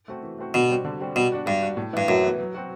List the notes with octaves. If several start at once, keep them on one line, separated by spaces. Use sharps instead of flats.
A3 C4 F#4
E3
A3 C4 F#4
B2 D3
G3 C4 F#4
D3
G3 C4 F#4
B2 G3
D4 F#4
G2 G3
D4 F#4
A2
G2 E3 B3 E4
F#2 A2
E3 B3 E4
F#3
C4 F#4